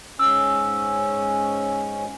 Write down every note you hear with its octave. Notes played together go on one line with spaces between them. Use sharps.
G#2 C#4 E6